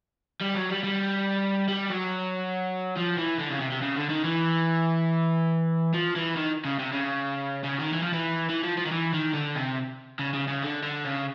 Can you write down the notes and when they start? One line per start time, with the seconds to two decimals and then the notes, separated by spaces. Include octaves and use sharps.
0.41 G3
0.55 F#3
0.69 G3
0.83 G3
1.68 G3
1.90 F#3
2.97 F3
3.18 E3
3.39 D3
3.50 C#3
3.60 C3
3.71 C3
3.81 C#3
3.96 D3
4.09 D#3
4.24 E3
5.94 F3
6.15 E3
6.36 D#3
6.65 C#3
6.79 C3
6.93 C#3
7.64 C#3
7.79 D#3
7.93 E3
8.03 F3
8.13 E3
8.49 E3
8.63 F3
8.77 F3
8.85 D#3
8.92 E3
9.13 D#3
9.34 D3
9.55 C3
10.19 C#3
10.34 C#3
10.48 C#3
10.62 D3
10.83 D3
11.05 C#3